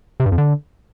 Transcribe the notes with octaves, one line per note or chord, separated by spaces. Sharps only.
C3
G2
F2
D3